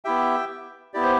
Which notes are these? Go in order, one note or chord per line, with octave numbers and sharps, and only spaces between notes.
B3 E4 G4 E5 G5
B3 E4 G4 D5
C5